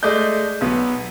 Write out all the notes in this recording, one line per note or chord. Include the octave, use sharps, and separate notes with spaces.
G#3 A3 D5 D#5 G6
B1 B3